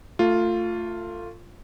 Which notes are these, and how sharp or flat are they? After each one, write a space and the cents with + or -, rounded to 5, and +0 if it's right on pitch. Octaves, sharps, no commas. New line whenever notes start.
A3 +25 F4 +0